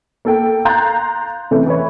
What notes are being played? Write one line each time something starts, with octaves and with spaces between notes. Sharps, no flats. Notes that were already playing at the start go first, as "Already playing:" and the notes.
A#3 A4 G5
F5 A#5 C6 F#6 G6 A6
C3 E3 A3 C#4
E3 E4 B4 C#5